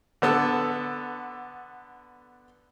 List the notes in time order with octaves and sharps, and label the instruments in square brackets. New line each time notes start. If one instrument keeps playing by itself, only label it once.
[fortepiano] D3 B3 A4